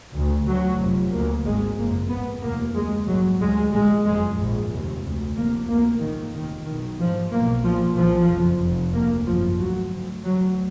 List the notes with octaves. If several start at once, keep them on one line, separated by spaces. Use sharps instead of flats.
D2
D2 F#3
F1 F2
D2 A#3
G#1 G#2 G#3
F#1 F2 A#3
A#1 G#2 B3
F1 D#2 A#3
D2 G#3
A#1 G#2 F#3
D2 G#3
A#1 A#2 G#3
F#1 F2 G#3
A#1 G#2
F1 D#2
D2
F1 F2 A#3
D2 A#3
A#1 G#2 D#3
F1 D#2 D#3
B1 B2 D#3
A#1 G#2 F3
B1 B2 A#3
B1 A#2 F3
B1 A#2 F3
F#1 F2
F1 F2
D2 A#3
G#1 F#2 F3
D2 F#3
D2
D2 F#3